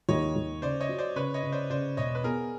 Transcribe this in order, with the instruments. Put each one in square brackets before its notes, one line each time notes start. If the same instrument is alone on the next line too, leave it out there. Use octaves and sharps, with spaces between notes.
[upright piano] D#2 [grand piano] C#5 D#5
[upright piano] D#2
[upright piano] C#3 [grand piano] C5 D5
[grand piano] C#5 D#5
[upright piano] F#3
[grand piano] C5 D5
[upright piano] C#3 [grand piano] B4 C#5
[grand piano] C#5 D#5
[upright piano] C#3
[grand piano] C5 D5
[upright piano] C#3 [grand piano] C5 D5
[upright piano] E1 [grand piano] C#5 D#5
[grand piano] B4
[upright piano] B3 [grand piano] G#4 A#4